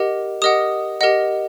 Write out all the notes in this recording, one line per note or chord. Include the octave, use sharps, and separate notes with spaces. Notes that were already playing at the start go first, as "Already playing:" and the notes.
Already playing: G4 A#4 D#5 F#5
G4 A#4 D#5 F#5 D#6
G4 A#4 D#5 F#5